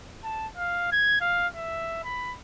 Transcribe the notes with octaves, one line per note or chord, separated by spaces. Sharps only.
A5
F5
G#6
F5
E5
B5